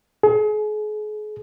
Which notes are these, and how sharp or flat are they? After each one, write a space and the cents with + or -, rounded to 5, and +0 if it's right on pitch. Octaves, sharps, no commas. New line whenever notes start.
G#4 +40